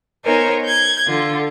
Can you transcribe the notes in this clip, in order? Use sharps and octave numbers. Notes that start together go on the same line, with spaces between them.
B3 D#4 A#4 C5 C#5 G#5
G6 G#6
D3 F4